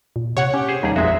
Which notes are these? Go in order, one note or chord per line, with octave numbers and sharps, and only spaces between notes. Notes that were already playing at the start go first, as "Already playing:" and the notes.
A#2
C3 C#5 F#5
C#4 G4
G#4 C5
D#2 G3 D#4 G#4
A#1 F2 G#3 F#4 E5